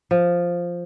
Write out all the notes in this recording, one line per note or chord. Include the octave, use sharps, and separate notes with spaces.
F3